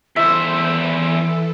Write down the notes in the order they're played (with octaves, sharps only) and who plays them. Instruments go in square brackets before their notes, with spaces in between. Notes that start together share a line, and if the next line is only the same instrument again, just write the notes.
[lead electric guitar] E2 C5 [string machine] E3 A4 [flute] E4 [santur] E5